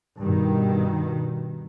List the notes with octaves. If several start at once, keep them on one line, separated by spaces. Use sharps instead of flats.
G2 B2 D#3